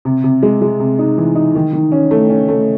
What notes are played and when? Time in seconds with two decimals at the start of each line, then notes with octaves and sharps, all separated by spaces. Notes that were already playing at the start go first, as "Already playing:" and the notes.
0.05 C3
0.24 C3
0.43 G#3
0.62 G#3
0.80 C3
0.99 D#4
1.18 E3
1.35 D#4
1.55 D#3
1.73 D#3
1.92 C#4
2.11 A3
2.30 C#4
2.49 A3